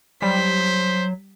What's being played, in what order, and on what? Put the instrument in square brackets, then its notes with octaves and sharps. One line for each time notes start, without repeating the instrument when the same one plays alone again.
[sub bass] F#3 [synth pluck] G3 [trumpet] C5 [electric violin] B6